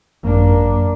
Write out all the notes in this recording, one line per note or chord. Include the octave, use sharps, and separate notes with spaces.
G#1 F#2 A#3 D4